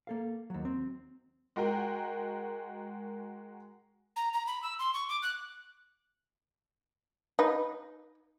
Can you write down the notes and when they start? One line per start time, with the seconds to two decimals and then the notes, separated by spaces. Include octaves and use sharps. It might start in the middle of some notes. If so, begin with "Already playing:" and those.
0.07 A#3 A4 F5
0.50 D#2 F#3
0.65 C4
1.56 G#3 F#4 A#4 G5
4.16 A#5
4.33 A#5
4.47 B5
4.63 E6
4.79 C6
4.94 C#6
5.09 D6
5.22 F#6
7.39 D#4 B4